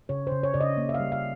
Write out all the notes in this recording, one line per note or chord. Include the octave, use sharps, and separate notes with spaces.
C#3 C#5
C#3 C5
C#5
C#3 D5
D#5
A#3
E5
F5
G3
F5